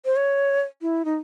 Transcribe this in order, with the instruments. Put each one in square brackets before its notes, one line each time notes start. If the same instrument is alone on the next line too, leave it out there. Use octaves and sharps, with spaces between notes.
[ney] C5
C#5
E4
D#4